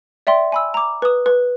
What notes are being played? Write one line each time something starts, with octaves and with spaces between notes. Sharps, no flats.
D5 E5 G5 C6
G#5 B5 E6
A#5 D6
B4 D#6
B4